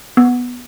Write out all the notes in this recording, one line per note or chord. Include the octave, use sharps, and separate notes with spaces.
B3